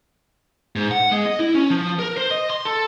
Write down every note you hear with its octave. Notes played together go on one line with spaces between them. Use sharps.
G#2
F#5
G#3
D#5
E4
C#4
F3
A#4
C5
D#5
C6
A4